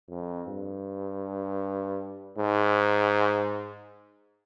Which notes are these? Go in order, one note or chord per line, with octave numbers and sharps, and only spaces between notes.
F2
G2
G#2